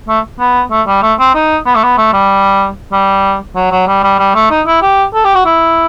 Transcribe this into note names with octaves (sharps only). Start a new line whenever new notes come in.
A3
B3
A3
G3
A3
C4
D#4
B3
A3
B3
A3
G3
G3
F#3
F#3
G3
G3
G3
A3
D#4
E4
G4
A4
G4
F#4
E4